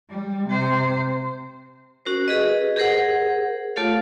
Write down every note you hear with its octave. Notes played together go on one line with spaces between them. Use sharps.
G3
C3 C5
C#4 F#4 A#4 C5
G4 G#4 B4 D#5
G4 G#4 A#4 C5 F#5
A3 F4 G4 A4 C#5 F5